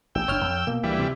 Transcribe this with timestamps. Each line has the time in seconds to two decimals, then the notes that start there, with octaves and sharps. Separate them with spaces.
0.15 A1 G5 E6
0.28 F#1 D4 C#5 F6
0.45 F2
0.67 B2 A#3
0.83 D2 E3 G3
0.99 C3